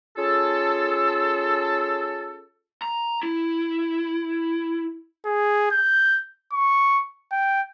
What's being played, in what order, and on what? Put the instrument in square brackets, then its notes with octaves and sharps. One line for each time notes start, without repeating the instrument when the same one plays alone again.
[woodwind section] C#4 F4 G#4 A4
[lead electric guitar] A#5
E4
[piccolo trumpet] G#4
G6
C#6
G5